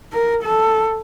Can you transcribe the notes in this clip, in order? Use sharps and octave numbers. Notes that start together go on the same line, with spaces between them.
A#4
A4